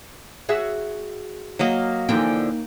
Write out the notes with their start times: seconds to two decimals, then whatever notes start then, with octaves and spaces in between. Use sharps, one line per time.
0.49 F#4 G#4 E5
1.59 F#3 A#3 D#5
2.09 D3 E3 F3 A#3 D#4 G5